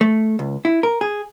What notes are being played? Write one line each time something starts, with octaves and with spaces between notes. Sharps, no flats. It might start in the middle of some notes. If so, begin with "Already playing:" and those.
A3
C#2
E4
A#4
G#4